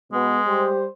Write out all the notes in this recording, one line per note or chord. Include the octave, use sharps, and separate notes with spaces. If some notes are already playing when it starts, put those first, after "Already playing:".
B2 G#3 B3
G3 G4 C5